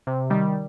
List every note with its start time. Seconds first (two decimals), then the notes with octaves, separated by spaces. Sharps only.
0.07 C3
0.30 D#3 G3